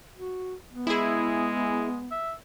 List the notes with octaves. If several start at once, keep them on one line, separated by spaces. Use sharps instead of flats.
F#4
B3
G#3 E4 G#4
E5